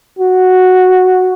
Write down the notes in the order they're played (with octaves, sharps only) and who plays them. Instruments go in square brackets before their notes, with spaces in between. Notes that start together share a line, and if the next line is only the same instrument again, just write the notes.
[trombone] F#4